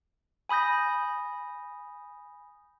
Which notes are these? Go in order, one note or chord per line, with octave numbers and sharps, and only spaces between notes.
G#5 B5 D#6 G6 A#6